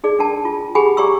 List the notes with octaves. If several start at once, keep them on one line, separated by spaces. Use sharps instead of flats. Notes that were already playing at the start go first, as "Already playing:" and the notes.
D#4 G#4 D5
D4 A#4 G5 A5
F4
G4 G#4 F#5 G#5 B5
G4 D5 A#5 C#6 D6 E6